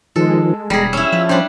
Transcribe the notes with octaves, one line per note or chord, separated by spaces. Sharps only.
D#3 F3 G#3 A4
E1 G3 G#3 G#4 A#5 B5
C#4 E4 E6
F3 B4
G3 C#4 D4 C5